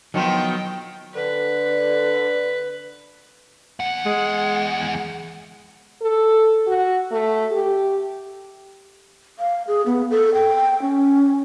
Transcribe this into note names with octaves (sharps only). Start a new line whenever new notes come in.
D#3 F3 F#3 B3 F4 G5
D3 B4
E2 F#5
G#3
A4
F#4
A3
G4
F5
G#4
B3
A4
G5
C#4